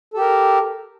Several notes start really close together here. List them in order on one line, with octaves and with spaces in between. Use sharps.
A4 G4 A#4